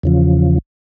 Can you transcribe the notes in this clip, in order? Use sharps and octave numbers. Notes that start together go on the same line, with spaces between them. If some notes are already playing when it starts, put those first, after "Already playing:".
E2 C#3 F3